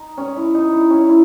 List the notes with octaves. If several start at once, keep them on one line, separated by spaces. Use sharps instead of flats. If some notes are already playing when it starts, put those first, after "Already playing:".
Already playing: D#4
C#4
E4
D#4
E4
C#4
E4